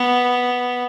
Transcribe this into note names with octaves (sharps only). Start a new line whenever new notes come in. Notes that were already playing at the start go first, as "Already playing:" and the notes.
Already playing: B3